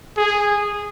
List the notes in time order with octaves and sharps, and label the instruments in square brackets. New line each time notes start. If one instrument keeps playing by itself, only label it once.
[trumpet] G#4